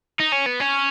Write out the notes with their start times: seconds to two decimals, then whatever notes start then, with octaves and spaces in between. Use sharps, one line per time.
0.20 D#4
0.32 C#4
0.46 B3
0.60 C#4